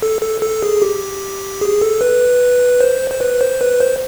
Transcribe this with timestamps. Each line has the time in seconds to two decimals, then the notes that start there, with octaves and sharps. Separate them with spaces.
0.02 A4
0.22 A4
0.42 A4
0.63 G#4
0.82 G4
1.61 G#4
1.82 A4
2.01 B4
2.81 C5
3.11 C5
3.21 B4
3.41 C5
3.61 B4
3.80 C5